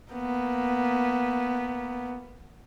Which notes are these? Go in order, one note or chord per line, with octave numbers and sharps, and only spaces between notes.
A#3 B3